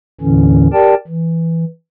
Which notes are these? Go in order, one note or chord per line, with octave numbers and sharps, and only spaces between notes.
D#2 A2 D3 E3 C#4
G4 A#4 D5 G5 A5
E3